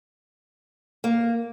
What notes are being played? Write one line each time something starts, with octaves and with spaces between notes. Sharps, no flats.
A#3